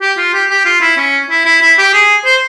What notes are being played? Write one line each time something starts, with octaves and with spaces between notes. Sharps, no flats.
G4
F4
G4
G4
F4
E4
C#4
E4
E4
E4
G4
G#4
C5